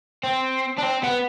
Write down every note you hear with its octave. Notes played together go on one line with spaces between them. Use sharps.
C4
D4
C4
B3